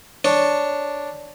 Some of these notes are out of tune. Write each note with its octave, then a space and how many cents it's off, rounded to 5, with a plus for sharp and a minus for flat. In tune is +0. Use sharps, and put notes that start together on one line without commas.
D4 +0 C#5 +0